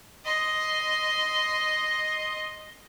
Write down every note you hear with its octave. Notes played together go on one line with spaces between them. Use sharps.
D#5 C6